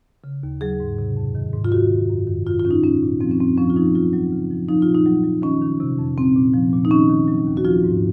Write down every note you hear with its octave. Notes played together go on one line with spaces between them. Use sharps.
C#3
D#2
F#3 G#4
G#2
C3
F2
D#3
G#2
F4
D#3 F#4
G#2
F#2
D#3
D#3 F4
F4
D#3 C#4
D#4
A#2 C#4
A#2
F3 C4
C#4
F#2 C4
F3 C#4
F4
F3 D#4
F#3 F4
F#3
C#3
F3
F3 D#4
A#2 F4
D#4
F#3
F#3
D#3 C#4
D#3
C3
F2
A#2 C4
A#2
F3
A#2
D#4
D#3 C#4
D#3
F#3
D#2
F#4
F3 F4
G#2